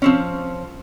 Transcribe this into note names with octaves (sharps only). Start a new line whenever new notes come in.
F3 C4 C#4